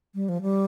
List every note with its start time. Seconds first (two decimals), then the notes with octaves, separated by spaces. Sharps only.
0.15 G3
0.29 F3
0.42 G3